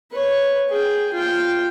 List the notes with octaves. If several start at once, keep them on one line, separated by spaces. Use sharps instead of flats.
B4 C#5
G#4 G5
F4 G5